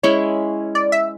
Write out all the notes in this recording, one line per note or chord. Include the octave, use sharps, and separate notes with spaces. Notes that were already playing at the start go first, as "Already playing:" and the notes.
G#3 C#4 E4 C#5
D5
E5